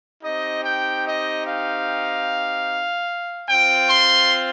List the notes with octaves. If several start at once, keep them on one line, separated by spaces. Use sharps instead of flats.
C4 D#4 G4 D#5
G5
D#5
F5
C4 F4 G5
C6